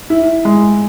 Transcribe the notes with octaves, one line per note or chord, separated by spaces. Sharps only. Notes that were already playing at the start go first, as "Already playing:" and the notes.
E4
G#3